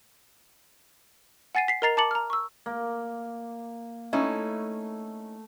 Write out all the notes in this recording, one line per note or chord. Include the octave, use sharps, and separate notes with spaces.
F#5 G#5 A6 C7 D#7
B6 C7
A#4 D#5 A#5 A6 C7 F7
A5 A#5 D6 A6 C#7 F#7
A#5 F6
C#6 E6
A#3
A3 C#4 D#4 E4